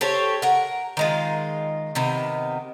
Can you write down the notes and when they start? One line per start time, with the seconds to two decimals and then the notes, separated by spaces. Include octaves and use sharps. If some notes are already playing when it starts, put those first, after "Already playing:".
0.01 G4 A4 C5 C#5
0.42 A#4 F#5
0.97 D#3 G#3 F4
1.95 C3 D#3 B3